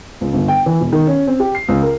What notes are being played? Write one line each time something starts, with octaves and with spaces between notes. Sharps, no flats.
C#2
G1
G5
E3
E1
D#3
C#4
C4
G4
C7
C#2
A#4